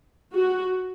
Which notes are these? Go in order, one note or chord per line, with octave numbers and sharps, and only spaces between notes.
F#4